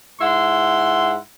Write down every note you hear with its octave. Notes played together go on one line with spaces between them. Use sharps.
G#2 E4 F#5 C6